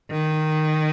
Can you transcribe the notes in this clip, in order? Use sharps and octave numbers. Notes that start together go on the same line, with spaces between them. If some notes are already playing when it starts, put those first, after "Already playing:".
D#3